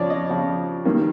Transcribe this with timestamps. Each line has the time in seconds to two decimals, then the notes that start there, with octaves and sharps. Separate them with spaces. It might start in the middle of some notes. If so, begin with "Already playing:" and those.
Already playing: F2 C#3 F3 C#5 D5
0.10 D#5
0.29 F2 C#3 F3
0.85 G2 D#3 F#3 A#3